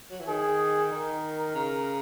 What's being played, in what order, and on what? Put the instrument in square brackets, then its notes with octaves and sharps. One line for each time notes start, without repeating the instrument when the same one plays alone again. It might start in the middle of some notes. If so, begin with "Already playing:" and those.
[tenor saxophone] F#3
E3
[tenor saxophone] D#3 [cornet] G#4
[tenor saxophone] D#3 [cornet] A#4
[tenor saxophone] C#3